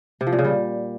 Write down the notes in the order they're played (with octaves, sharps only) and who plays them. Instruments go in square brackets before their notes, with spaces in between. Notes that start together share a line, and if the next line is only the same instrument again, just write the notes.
[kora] C3
F3
A#2
C#3
G3